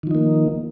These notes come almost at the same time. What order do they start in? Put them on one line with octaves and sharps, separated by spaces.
D#3 F3 D#4 A#3